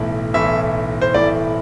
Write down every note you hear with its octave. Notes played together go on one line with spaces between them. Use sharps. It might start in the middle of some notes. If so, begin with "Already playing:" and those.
Already playing: B1 A2 E3 A3 E4
B1 A2 E3 A3 E4 E5
C5
B1 A2 E3 A3 E4 D5